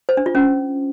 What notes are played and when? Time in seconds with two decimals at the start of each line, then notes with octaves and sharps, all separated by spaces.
0.09 C5
0.17 D4
0.26 F4
0.35 C#4